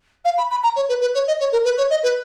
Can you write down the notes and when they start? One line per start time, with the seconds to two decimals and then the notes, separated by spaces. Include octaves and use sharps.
0.25 F5
0.37 B5
0.50 B5
0.63 A#5
0.75 C#5
0.88 B4
1.01 B4
1.14 C#5
1.27 D#5
1.39 C#5
1.52 A#4
1.64 B4
1.77 C#5
1.90 D#5
2.03 B4